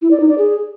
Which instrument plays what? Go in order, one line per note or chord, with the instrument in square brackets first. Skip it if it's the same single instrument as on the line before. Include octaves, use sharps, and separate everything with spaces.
[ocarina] E4
D5
D#4
D5
G#4